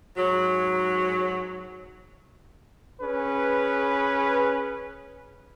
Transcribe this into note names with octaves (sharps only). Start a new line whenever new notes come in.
G#2 F#3
C#4 G#4 B4